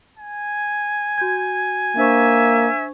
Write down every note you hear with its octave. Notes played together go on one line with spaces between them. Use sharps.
G#5
F#4 G6 G#6
A#3 D4 C5 E5 C#6